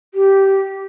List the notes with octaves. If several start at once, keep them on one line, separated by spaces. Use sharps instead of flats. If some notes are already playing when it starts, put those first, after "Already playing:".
G4